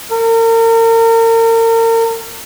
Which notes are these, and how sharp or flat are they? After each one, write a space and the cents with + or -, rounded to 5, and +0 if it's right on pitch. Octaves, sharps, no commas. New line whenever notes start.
A#4 -35